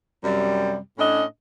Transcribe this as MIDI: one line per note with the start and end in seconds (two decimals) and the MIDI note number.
0.24 0.78 42
0.24 0.78 48
0.24 0.78 55
0.99 1.24 45
0.99 1.24 61
0.99 1.24 62
0.99 1.24 75